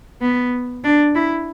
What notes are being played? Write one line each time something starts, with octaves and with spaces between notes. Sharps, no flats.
B3
D4
E4